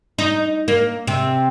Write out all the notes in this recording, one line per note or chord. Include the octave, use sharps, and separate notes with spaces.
D#4
A#3
C3